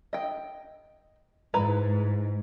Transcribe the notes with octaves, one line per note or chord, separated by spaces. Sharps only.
D#5 G5
G#2 E4 B4 A#5